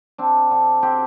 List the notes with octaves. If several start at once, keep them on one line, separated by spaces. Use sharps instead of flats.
C4 D4
D3
C4 G4